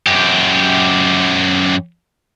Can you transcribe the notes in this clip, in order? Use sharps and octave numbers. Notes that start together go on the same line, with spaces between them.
F#2 G4